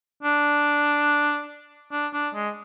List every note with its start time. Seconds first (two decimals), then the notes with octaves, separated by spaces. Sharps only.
0.23 D4
1.92 D4
2.14 D4
2.35 G#3